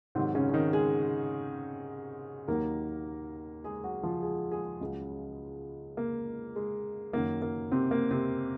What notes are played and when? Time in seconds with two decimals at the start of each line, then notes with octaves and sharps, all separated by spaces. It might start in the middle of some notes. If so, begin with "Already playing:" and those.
0.15 G#2 C3 D#3 F#3 C4
0.35 C#3 C#4
0.49 C#4
0.53 D#3 D#4
0.73 G#3 G#4
2.48 D#2 D#3 F#3 A#3 A#4
3.64 G#3 G#4
3.84 F#3 F#4
4.03 F3 F4
4.22 G#3 G#4
4.51 G#3 G#4
4.81 C#2 C#3 F#3
5.97 A#3
6.56 G#3
7.13 F#2 D#3 F#3 A#3
7.42 A#3
7.72 C3 C4
7.91 A#3
8.11 C3 C4